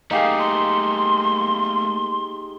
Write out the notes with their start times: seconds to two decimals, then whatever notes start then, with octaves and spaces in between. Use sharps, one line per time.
0.11 A3 A#3 D#4 G4 G#4 F5
0.39 C6